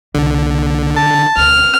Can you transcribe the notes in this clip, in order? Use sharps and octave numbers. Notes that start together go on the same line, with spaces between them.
C2 D3 A#3
A5
E1 D2 F6